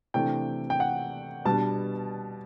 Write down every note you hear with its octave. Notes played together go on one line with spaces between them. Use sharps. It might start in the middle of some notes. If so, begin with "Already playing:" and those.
C3 E3 A3 D4 G5
G5
F#5
B2 G3 B3 D4 A5